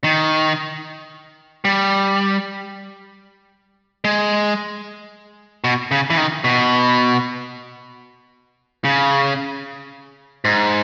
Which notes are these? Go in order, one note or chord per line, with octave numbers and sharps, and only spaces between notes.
D#3
G3
G#3
B2
C#3
E3
D#3
B2
C#3
G#2